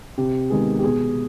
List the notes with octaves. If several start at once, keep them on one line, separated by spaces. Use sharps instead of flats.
C3 G4
D#3 G#3 B3 G#4
G4
B2 G#4